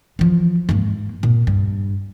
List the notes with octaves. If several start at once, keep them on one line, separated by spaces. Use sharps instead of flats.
E3 F3
G#2 A#3
A#2
G2